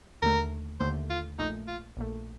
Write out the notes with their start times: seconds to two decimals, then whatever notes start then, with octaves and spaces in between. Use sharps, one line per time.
0.22 D#2 D3 A3 A#4
0.80 D#2 D3 A3 C5
1.10 F4
1.39 A#1 A#2 A3 D#4
1.68 F4
1.97 A#1 A#2 A3